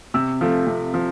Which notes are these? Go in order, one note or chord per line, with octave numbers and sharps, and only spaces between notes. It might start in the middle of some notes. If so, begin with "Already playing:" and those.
C3 E6
F3 A3
C3
F3